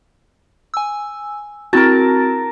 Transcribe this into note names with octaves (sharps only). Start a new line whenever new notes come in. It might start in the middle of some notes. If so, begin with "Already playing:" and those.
G#5 E6
C4 E4 F#4 A#4 A5